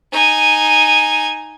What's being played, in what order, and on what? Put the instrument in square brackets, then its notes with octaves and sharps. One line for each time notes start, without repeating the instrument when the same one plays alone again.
[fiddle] D#4 G#5